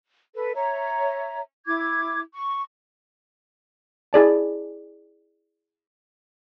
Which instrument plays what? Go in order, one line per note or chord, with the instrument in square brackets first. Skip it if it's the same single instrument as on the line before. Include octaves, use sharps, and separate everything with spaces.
[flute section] A4 B4
C#5 E5 A#5
E4 D6 G#6
C#6
[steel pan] E4 G#4 D5 A5